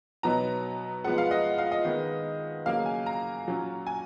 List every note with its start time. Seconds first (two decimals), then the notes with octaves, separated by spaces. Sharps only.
0.23 B2 F#3 B3 D#4 A#5
1.04 F3 G#3 B3 F#5
1.18 F5
1.31 D#5
1.58 F5
1.72 D#5
1.85 D#3 G#3 B3
2.66 C#3 F#3 A#3 F5
2.86 G#5
3.06 A#5
3.47 A#2 F#3 C#4
3.87 G#5